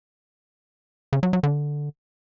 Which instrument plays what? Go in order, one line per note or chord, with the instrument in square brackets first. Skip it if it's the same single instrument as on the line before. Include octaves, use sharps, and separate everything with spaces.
[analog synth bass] C#3
F#3
F#3
D3